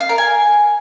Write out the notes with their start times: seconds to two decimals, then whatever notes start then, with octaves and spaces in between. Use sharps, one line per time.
0.01 F5
0.09 A#4
0.18 G#5